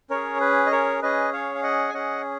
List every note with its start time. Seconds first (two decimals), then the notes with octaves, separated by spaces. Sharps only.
0.10 C#4 G#4 A#4 C#5
0.41 B4
0.66 D#5
0.71 A#4 C#5
1.02 C#4 G#4 B4 D#5
1.33 C#5 F5
1.55 F5
1.63 D#5 F#5
1.89 G#5
1.94 C#4 G#4 D#5 F#5